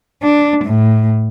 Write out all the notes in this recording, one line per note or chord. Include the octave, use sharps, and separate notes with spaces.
D4
A2